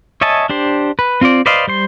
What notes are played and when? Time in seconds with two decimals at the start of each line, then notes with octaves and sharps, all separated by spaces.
0.21 C#5 D#5 E5 G#5 A5
0.49 D4 G4 C5
0.99 B4
1.21 C4 F4 C5 D5
1.46 B4 C5 D5 D#5 F5
1.67 G3 C5 C6